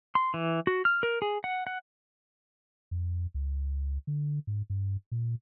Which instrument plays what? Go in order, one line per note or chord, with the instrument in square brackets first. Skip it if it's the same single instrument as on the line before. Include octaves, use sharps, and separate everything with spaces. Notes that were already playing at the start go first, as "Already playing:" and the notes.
[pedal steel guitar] C6
E3
F#4
F6
A#4
G#4
F#5
F#5
[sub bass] F2
C#2
D3
G#2
G2
A#2